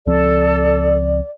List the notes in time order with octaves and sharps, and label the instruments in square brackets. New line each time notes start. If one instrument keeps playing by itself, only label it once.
[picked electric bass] C#2 F3 C4 [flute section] A4 [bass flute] D5